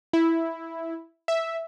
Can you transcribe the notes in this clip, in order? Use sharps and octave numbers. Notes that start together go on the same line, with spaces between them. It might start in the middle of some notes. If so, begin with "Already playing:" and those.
E4
E5